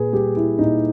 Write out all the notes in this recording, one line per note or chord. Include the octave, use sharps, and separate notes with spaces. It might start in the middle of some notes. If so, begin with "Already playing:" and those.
Already playing: A#2 G#4 B4
G3 G4
E4
A#2 D#4